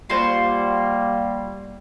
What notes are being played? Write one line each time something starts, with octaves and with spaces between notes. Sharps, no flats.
G3 A#3 F4 F#4 C5